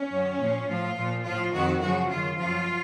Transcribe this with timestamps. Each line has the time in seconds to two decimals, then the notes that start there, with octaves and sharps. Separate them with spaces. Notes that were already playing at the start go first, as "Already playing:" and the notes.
Already playing: C#4
0.10 F#2 D#3
0.39 A#2 F3
0.67 A2 F3 F4
0.95 A#2 F3
1.24 A2 F3 F4
1.52 F2 D#3 F#4
1.80 F#2 C#3 F3 F#4
2.09 F#2 D#3 F4
2.37 F#2 F3 F4